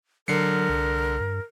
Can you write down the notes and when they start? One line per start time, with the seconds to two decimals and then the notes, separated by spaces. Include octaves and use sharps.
0.28 D3 F#3 A#4 C7 C#7
0.69 C2
1.20 G2